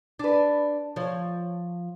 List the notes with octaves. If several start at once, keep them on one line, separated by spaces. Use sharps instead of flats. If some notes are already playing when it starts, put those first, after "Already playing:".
D4 B4
F3 C#5